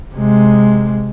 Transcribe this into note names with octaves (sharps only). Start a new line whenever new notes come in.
C3 G#3